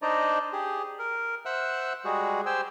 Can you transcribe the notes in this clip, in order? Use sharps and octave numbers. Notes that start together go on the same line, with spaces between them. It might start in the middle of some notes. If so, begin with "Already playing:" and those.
D4 D#4 C5 D5 D#5 A#5
G4 G#4
A#4
C5 E5 F#5 E6 F#6
G3 G#3 F#4 G#4
G4 C5 G5 G#5 E6